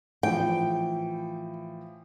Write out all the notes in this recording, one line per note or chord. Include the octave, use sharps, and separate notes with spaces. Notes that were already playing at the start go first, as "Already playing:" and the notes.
A2 E3 F3 G5